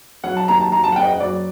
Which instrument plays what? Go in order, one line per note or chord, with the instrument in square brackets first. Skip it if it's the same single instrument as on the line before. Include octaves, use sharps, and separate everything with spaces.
[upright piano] F#3 F#5
A5
D#2 A#5
A5
F#3 A#5
A5
F#5
F#1 G5
D#5
F#5
F#3 D5